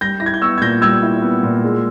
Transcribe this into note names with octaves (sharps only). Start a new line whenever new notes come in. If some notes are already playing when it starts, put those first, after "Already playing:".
G3 G6 A#6
E4 A#6
G#6
G6
B3 C#6 E6
G#6
A#2 G6 A#6
G3 E6 G#6
E4
B3
A#2
G#3